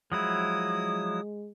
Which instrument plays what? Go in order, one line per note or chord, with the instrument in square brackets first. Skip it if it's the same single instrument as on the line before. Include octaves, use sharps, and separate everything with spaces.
[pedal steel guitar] F3 F#3 E4 [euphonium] G#3 [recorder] D#6